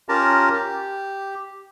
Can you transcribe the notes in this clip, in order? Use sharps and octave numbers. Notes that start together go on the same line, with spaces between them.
C#4 F4 G4 A#4 A5 A#5
G4